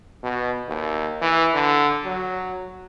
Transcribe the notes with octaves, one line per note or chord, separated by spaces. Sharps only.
B2
D#2
E3
D3
F#3